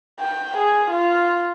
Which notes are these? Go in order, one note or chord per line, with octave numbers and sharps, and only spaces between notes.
G5
G#4
F4